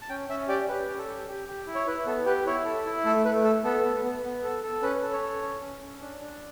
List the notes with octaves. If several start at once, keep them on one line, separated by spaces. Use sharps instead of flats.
A5
C#4 G5
C#4 E5
G4 D5
G4 B4
C#4
A4
G4
G4
G4
E4
C#5
E4 B4
B3 A4
G4 B4
E4 C#5
A4
E4
A3 A4
A3 B4
A4
B3 A4
B3
B3
B3
A4
A4
C#4 B4
A4
C#5
A4
C#4
C#4
C#4
D4
D4